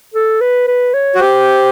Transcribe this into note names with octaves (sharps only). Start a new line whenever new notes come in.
A4
B4
B4
C#5
F#4
G4 C5